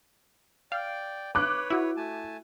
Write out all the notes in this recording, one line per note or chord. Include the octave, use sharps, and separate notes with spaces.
D5 F5 G5
B4 C#5 D6 F#6
E4 F#4
A3 G#5 A5